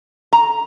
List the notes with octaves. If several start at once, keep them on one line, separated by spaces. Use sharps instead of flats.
A#5